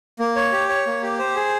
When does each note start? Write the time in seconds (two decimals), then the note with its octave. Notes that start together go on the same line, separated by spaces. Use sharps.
0.19 A#3
0.36 C#5
0.52 G4
0.69 C#5
0.86 A#3
1.03 G4
1.19 C5
1.35 G#4